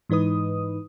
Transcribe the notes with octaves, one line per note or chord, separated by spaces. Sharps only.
G#2 E3 D#4 B4 D#6